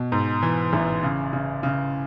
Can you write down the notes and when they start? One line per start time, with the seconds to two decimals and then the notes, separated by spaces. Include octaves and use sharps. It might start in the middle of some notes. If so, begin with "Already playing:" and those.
Already playing: B2
0.12 G#2
0.42 E3
0.73 A1
1.03 C#3
1.33 C#3
1.63 C#3